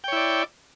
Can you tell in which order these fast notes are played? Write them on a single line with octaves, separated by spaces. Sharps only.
G5 C#5 E4 D5